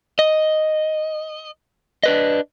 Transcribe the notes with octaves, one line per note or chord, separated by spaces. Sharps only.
D#5
D4 B4 D#5